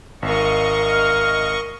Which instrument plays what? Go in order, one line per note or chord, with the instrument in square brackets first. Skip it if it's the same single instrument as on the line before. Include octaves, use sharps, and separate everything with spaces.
[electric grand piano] G#1 [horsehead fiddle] A#4 F5 [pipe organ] D#5 C#6
[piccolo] F6